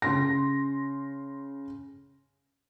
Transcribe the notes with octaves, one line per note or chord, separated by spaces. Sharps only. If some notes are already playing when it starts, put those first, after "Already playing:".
C#3 C6 A#6